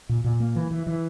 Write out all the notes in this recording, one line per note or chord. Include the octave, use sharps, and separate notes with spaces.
A#2
A#2
A#3
E3
E3
E3